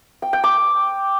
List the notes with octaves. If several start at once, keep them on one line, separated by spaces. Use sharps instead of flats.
G5
G5
D6